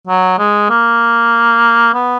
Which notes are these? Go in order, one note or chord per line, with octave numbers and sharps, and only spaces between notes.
F#3
G#3
A#3
B3